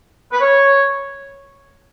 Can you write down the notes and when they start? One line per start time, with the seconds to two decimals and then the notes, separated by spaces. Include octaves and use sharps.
0.31 B4
0.40 C#5